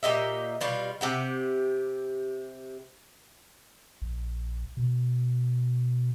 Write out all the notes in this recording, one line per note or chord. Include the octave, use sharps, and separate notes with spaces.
A#2 G4 D#5 E5
B2 G3 F4
C3 G4 F#5
A#1
B2